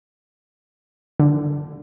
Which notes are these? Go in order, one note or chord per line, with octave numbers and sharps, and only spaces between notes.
D3